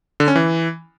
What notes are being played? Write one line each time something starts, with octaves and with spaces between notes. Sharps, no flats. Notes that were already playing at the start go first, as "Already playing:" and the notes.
D3
C#4
E3